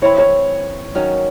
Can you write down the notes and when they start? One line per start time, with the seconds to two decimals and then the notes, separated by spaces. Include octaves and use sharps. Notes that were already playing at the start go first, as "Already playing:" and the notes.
0.02 E3 C4 E4 C#5
0.18 C#5
0.95 D#3 F#3 C#4